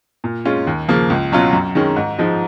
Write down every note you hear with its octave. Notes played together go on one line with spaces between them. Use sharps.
A#2
G#3 C#4 F4
D#2
C#3 F3 A#3
C#2
B2 F#3 C#4 F4
F#2
D#3 G#3 C#4
G#2
F3 G#3 D#4